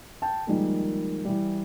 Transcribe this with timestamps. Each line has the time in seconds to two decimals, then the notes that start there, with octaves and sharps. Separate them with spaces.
0.22 G5 A5
0.47 D#3 F3 G3 G#3 A#3
1.25 E3 G3